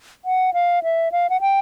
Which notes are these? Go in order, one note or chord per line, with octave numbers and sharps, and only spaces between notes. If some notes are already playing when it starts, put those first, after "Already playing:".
F#5
F5
E5
F5
F#5
G5